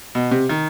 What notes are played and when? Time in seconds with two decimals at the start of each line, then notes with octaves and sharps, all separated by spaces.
0.15 B2
0.31 C3
0.49 D#3